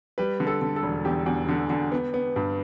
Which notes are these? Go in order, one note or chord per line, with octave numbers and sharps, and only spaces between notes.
G3 B4
D3
A4
D3
A4
E1
E2 G4
E2
D3
D3
B3
B3
G2